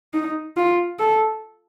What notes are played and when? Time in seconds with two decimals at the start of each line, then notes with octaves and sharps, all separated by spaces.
0.14 D#4
0.57 F4
0.99 A4